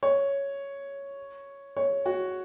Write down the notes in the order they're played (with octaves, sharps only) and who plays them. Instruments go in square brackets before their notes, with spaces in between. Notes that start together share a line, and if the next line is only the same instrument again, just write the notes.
[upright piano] C#5
C#5
F#4